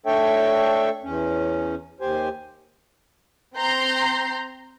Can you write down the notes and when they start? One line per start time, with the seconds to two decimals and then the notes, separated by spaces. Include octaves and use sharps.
0.06 A3 D4 A4 C#5 E5 G5
1.03 E2 C#4
2.01 D#2 G4 C5 G#5
3.57 C4 A#5 C6 G6